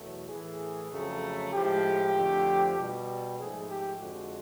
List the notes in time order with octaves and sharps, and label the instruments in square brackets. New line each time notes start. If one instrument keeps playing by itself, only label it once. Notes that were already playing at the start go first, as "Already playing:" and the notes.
Already playing: [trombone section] E2 B2 F#3 A3
A2 E3 A3 G#4
F2 C#3 F#3 A3
A2 F3 G#3 G4
F2 D3 F3 A3
B2 G3
G#2 F3 A3 G#4
G4
F2 D3 F3 G#3 F#4